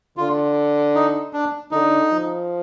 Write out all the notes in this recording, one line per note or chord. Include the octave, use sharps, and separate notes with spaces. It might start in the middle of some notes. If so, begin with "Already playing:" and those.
D3 F4
D#4
D4
D3 D#4
F3